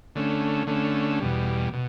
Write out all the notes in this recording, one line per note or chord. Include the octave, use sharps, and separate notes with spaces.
D3 A3 C#4
D3 A3 C#4
E2 B2 G3
B2